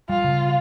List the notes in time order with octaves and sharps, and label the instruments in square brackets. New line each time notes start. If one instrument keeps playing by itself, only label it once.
[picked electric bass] G3 [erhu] F4
[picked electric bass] C#3